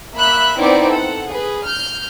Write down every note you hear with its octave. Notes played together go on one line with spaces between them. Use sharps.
A#3 E5 B5 F#6
B3 C4 D#4 E4 D5 D6
A4 F#5
G#4 B4
F6 G6